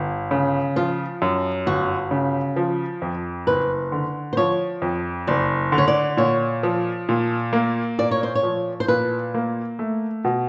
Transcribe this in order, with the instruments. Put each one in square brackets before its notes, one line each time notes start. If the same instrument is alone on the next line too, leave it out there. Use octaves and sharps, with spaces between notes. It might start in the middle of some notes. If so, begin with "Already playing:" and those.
Already playing: [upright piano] G1
C#3
[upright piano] F3 [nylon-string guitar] F4
[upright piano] F#2
[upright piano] G1 [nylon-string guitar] F#4
[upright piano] C#3
F3
F2
[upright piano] F#1 [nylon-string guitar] B4
[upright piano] D3
[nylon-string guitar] C5
[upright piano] F3 [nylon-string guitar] C#5
[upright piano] F2
[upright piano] F#1 [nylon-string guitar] D5
[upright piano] D3
[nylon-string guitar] C#5
D5
[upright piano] A#2 [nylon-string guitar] C#5
[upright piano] F3
A#2
A#3
[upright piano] A#2 [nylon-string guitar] D5
[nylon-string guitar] C#5
C5
C#5
[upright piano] F3
[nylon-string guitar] C5
[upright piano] A#2 [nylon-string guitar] B4
[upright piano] A#3
A3
B2